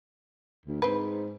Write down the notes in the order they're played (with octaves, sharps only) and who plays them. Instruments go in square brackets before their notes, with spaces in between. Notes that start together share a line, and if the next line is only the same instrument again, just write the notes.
[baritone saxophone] D2
[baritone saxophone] G#2 [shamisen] C4 B4